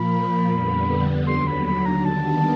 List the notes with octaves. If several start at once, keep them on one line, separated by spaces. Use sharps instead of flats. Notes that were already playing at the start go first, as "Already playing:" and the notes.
Already playing: A#2 F3 A#3 B5
F2 D3 G3 B3
D#2 D3 F#3 C6
B5
B5
A#5
D#2 D#3 G3 B3 D4 A5